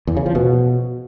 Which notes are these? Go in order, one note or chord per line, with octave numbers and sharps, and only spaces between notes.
E2
C#3
F3
B2